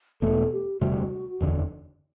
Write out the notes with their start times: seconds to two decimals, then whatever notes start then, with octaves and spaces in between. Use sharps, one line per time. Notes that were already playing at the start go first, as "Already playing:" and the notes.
0.22 E1 E2 B2 A3 A4
0.52 G4
0.81 E1 D2 C3 G3 F#4
1.41 F#1 E2 D3